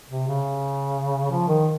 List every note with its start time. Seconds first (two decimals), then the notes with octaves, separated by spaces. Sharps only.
0.10 C3
0.28 C#3
1.31 F3
1.48 D#3